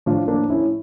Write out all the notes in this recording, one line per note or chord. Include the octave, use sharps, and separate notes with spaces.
A2 F3 D4 F4
A#3 D4
C#4 E4